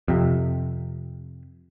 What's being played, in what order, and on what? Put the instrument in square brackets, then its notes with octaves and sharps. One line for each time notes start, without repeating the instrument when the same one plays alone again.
[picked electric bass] F2 C3